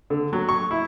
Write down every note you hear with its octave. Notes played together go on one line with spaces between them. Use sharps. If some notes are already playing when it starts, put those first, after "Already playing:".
D3
F#3
C#6
E4